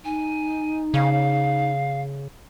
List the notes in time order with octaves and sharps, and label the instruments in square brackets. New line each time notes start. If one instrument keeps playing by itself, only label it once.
[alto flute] D#4 [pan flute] G#5
[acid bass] C#3 [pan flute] F5